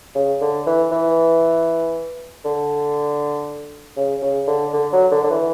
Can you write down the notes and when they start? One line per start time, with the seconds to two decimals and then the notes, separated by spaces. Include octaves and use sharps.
0.15 C#3
0.41 D3
0.66 E3
0.91 E3
2.45 D3
3.97 C#3
4.22 C#3
4.48 D3
4.73 D3
4.92 F#3
5.11 D3
5.23 D3
5.30 E3